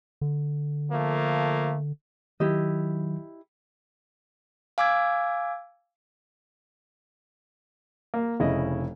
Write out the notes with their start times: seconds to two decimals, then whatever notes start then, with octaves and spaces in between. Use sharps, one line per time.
0.21 D3
0.91 F3 A3 A#3
2.40 D#3 F#3 E4 G4 D#5
4.78 F5 G#5 D6 E6 G#6
8.14 A#3
8.40 F1 C#3 E4 D#5